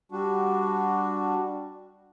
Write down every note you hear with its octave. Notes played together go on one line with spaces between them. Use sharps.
G3 D4 F#4